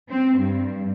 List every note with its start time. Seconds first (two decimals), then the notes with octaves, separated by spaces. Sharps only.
0.10 C4
0.39 G2